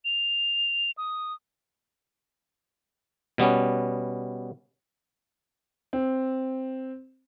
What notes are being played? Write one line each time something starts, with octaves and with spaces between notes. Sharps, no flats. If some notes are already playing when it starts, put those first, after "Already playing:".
F7
D#6
B2 G3 B3 C#4
C4